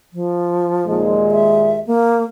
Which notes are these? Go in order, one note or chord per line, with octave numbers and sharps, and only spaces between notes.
F3
D#2 A#2 G#3
E5
A#3